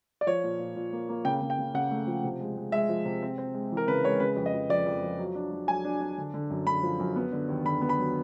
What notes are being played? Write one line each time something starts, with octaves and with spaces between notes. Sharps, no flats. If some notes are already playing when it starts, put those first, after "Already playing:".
D5
F3 C#5
A#2
A#2
A#2
A#3
A#3
C#3 G5
C#3
G5
C#3
C#3 F#5
A3
F3
C3
G#3
G#3
G#3 E5
F3
C3
C4
C4
G#3
E3
A#4
C#3 B4
G#3 C#5
C#3 B4
F2
D#5
F3
F2 D5
F2
F3
F#3
D4
F#3
F#3 G#5
D4
D4
D3
D3
F#2
D3 B5
F3
F#2
B3
D3
D#2
D3 B5
B3
B5
F#3